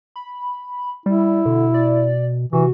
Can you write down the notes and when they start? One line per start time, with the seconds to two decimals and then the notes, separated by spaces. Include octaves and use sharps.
0.16 B5
1.06 G3 E4
1.45 B2 D3
1.74 D5
2.53 C3 E3 F#4